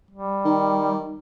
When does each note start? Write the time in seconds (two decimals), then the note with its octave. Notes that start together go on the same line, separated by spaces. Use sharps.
0.11 G3
0.45 D#3